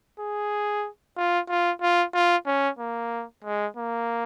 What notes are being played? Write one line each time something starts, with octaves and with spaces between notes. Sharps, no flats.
G#4
F4
F4
F4
F4
C#4
A#3
G#3
A#3